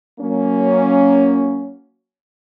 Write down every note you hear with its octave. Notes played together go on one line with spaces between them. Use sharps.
F#3 A#3 C#4